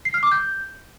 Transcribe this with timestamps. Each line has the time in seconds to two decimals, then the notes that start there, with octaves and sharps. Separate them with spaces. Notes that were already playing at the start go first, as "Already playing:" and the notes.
0.05 C7
0.14 F6
0.23 D6
0.32 G6